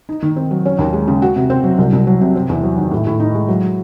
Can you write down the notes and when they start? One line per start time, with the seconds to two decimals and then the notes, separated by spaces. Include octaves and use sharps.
0.09 D#4
0.22 D#3
0.36 C4
0.51 F#3
0.66 C#4
0.79 D#2
0.93 G#3
1.08 C#3
1.22 F#4
1.36 C3
1.50 C4
1.64 F#3
1.78 C2
1.93 C2
2.07 F#3
2.21 C3
2.35 C4
2.49 E2
2.64 F#3
2.78 D#3
2.91 A2
3.07 A2
3.20 D#4
3.35 G#3
3.48 F#3